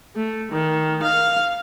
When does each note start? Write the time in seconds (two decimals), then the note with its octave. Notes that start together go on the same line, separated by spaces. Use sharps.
0.16 A3
0.52 D#3
1.03 F5